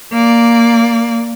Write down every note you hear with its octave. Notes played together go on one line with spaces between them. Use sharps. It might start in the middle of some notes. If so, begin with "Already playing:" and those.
A#3 D5